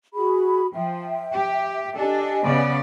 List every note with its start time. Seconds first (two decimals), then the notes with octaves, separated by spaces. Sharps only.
0.14 F#4 G#4 B5
0.74 F3 E5 G5
1.34 G4
1.98 D4 G4 A4 D#5 G#5
2.44 C#3 B3 D5